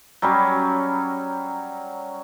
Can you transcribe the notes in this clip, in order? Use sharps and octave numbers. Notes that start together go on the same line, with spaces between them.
F#3 G3 C#4